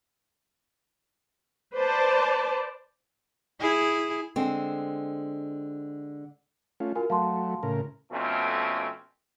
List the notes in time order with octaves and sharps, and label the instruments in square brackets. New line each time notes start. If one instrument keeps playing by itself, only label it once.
[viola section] B4 C5 D5 A5
[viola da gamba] E4 G#4
[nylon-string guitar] D3 G#3 C4
[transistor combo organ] A3 C#4 F4
[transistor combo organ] F4 [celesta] F#4 A#4 G#5
[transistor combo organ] F#3 A3 [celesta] F5 A5 C6
[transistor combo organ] A2 C#3 A#4
[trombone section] F2 B2 A3 C4 C#4